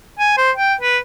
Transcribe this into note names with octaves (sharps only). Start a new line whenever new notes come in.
G#5
C5
G5
B4